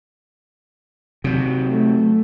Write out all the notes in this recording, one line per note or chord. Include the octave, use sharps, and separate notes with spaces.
C3 F#3
A3